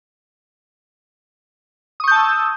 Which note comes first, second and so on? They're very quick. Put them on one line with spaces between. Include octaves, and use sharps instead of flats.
D#6 C#6 G6 A5 E6